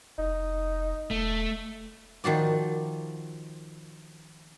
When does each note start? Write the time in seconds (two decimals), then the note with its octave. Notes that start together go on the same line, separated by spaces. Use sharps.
0.18 F1 D#4
1.11 E1 A3
2.24 D#3 F3 F#4 D5